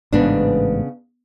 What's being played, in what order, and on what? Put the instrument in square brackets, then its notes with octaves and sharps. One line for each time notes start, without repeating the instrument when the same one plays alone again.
[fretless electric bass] A1 G#2 [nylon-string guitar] C#3 B3 D4